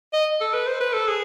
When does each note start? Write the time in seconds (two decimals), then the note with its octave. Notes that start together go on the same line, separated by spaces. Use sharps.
0.13 D#5
0.41 A4
0.54 B4
0.67 C5
0.81 B4
0.93 A4
1.07 G#4